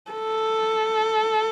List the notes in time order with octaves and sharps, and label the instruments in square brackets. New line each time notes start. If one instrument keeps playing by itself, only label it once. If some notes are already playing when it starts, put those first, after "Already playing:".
[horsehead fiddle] A4